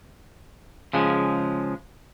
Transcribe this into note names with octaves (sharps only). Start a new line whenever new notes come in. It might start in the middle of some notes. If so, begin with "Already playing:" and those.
C#3 F3 G#3